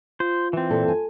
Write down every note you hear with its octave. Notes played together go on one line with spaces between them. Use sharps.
F4 C5
E3 C4
A#2 A4
G#5